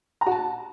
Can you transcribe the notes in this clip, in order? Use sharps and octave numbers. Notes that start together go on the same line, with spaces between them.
A#5
F#4
A5